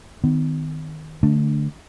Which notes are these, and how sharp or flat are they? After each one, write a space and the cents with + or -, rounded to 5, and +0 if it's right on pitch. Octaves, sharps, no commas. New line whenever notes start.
D#3 +0 B3 +40
D3 +0 A3 +0 D4 -15